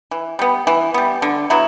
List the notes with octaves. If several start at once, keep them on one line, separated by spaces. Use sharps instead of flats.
E3
G3 B3
E3
G3 B3
D3
F#3 B3 E4